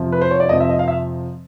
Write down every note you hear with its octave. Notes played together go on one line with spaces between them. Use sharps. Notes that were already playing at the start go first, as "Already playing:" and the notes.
Already playing: F2 C3 F3
B4
C5
C#5
D5
F2 C3 F3 D#5
E5
D#5
F5
E5